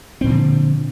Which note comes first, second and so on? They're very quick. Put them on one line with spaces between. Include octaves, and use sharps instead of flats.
C4 A#2 F3 D3